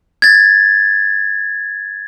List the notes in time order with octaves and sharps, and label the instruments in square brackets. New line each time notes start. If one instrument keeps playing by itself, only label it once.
[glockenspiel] G#6 A6